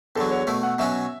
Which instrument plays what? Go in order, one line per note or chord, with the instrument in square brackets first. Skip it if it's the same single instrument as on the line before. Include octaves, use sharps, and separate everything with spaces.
[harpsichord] E2 D3 F#3 [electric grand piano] A4
[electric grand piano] C#5
[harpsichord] B2 A3 E4
[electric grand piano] F#5
[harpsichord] B2 F#3 C#4 F#4 [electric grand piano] E5